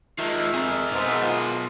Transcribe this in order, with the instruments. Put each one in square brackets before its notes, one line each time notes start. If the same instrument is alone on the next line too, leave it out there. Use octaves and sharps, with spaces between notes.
[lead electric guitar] D#3 G#3 [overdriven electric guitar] F4 D#5 [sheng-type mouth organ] E5 F6
[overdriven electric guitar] F2 C4 [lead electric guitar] G#4 A#4
[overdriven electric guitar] B1 B3 [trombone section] G#2
[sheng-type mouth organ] F4